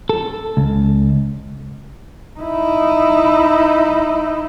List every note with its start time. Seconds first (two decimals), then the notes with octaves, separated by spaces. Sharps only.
0.09 A4
0.57 C#2
2.39 D#4 E4